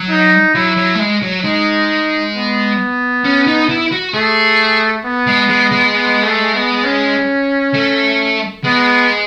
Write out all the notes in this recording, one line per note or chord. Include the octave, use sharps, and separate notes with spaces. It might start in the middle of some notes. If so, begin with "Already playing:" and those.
Already playing: F#3
D#4
F#3 E4
F#3
A3
G#3
F#3
G#3 D#4
B3
C#4
D#4
E4
F#4
A3 G#4
B3
G#3
G#3
G#3
B3
A3
B3
C#4
A3
G#3 B3